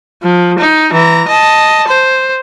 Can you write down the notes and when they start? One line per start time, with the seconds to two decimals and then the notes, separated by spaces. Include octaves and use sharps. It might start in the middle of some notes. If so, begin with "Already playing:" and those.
0.23 F3
0.59 D#4
0.93 E3 A#5
1.28 D#5 A5
1.88 C5